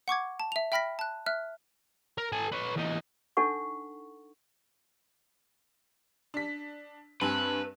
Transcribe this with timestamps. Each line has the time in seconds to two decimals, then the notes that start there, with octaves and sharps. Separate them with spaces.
0.08 F#5 C#6 D6 G#6
0.40 A5
0.52 E5 F7
0.72 E5 G5 B5 F6 A#6 B6
0.99 A5 F#6
1.26 E5 F6 F#6
2.18 A#4
2.32 A4 G#5
2.52 B4 C#5
2.76 E2 D#4
3.37 D4 D#4 A4 F#5 C#6
6.34 D4 B6
7.21 G2 C4 B4 G#5